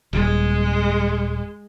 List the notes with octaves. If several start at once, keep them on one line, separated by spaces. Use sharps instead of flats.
D#1 G#3